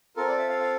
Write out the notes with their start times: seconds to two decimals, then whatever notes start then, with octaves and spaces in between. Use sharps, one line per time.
0.16 C4 F4 A4 A#4
0.28 D5
0.38 E5
0.49 F5
0.60 F5